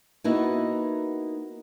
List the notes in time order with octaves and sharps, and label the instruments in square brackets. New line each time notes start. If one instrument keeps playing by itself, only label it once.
[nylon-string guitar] A#3 B3 D#4 E4 F#4